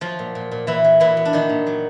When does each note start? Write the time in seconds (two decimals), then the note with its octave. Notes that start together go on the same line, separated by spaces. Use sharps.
0.01 F3 F#3 F4
0.19 A#2
0.35 A#2
0.52 A#2
0.67 A#2 E3 E4
0.84 F#3
1.00 A#2 E3 E4
1.17 B3
1.25 D4
1.33 A#2 D#3 D#4
1.49 A#2
1.67 F#3